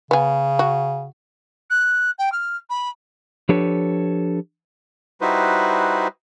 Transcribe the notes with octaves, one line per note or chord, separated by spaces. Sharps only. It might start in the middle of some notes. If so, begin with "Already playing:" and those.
C#3 B3 G#4
F#4
F#6
G5
F6
B5
F3 D4 G4 A4 B4 C#5
G3 D#4 E4 F#4 B4 C5